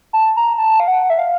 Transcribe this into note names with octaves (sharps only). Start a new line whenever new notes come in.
A5
A#5
A5
F5
F#5
E5
F5